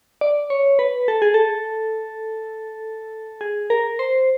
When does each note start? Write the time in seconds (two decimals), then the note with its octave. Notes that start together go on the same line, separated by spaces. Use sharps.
0.21 D5
0.50 C#5
0.79 B4
1.08 A4
1.22 G#4
1.34 A4
3.41 G#4
3.70 A#4
3.99 C5